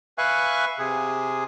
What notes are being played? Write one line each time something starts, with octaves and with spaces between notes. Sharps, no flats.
B4 E5 F5 G#5 C#6 F#6
C3 G#4